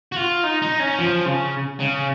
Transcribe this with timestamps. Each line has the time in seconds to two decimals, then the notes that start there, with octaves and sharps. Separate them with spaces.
0.12 F#4
0.16 F4
0.44 D#4
0.62 D#4
0.80 C#4
0.99 F3
1.25 C#3
1.80 C#3